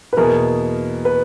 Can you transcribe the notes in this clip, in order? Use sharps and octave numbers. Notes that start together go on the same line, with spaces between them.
B4
E2 B2 A#3 E4 G#4 A#4
B4